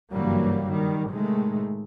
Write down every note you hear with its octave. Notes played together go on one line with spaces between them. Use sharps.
F#1 G2 E3 F#3 G3 A#3
D#3 G3
A2 C3 D#3 G#3 A3